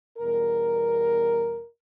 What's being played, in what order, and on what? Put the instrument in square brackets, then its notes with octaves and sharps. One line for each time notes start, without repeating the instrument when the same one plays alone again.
[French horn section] E2 B2 G3 A#4